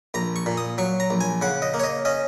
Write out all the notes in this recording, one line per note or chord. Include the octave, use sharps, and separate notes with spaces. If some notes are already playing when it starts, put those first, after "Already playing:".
A#1 A#5
C#6
A#2
D#6
F#3 C#6
A#5
A#1
G#5
C#3 F#5
D#5
A#3
C#5
D#5
C#4 D#5